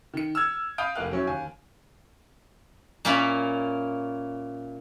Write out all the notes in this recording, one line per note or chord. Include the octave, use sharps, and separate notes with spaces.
D#3 C#7
E6 F6 G#6
F5 B5 D#6 G6 D7
F1 A#3 F5 F#6
F#3 C#4 E4
D#2 G#5
A#2 A#3 C#4 E4 B5